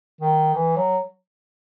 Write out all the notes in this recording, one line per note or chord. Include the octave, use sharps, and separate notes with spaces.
D#3
E3
F#3